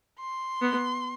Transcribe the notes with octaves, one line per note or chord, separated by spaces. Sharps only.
C6
B3